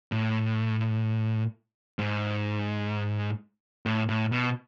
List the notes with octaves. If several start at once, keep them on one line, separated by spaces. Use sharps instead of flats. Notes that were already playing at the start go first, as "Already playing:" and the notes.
A2
G#2
A2
A2
B2